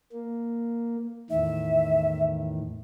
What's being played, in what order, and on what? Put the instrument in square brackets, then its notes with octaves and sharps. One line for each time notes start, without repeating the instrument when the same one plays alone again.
[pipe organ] A#3
[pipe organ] E2 A2 D#3 [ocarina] E5